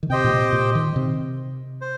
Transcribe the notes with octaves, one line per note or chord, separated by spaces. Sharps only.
D#3
C3 G4 C5 D#5 G5
A#2
C3
A#2
D#3
C3
C5